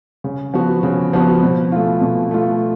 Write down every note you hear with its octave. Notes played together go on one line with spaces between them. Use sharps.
C#3
F3 B3 F#4
C#3
F3 B3 F#4
B2
A3 F4
B2
A3 F4